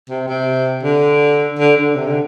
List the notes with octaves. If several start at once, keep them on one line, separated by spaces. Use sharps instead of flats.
C3
C3
D3
D3
D3
C3
D3